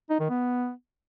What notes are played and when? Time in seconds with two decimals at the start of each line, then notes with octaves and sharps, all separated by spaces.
0.10 D#4
0.20 D#3
0.30 B3